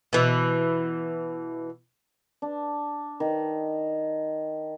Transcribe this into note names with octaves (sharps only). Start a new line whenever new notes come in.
B2 E3
D4
D#3